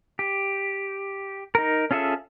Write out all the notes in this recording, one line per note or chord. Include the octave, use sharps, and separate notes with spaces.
G4
D#4 A#4
C#4 F4 G#4 A4 E5